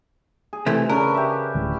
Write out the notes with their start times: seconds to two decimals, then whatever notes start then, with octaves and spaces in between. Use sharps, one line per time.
0.53 G#4
0.66 C3 E3 A3
0.89 C#3 C#4 D4 A#4 B4
1.14 G4 E5
1.54 D1